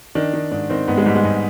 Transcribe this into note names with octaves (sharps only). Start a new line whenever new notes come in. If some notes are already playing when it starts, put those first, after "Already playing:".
D#3 D4
D#3
G#2 D4
D#3 C4
G#2 B3
G#3
G#2 G3
G#3
G#2